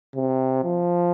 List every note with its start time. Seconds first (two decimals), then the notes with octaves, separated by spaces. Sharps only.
0.15 C3
0.64 F3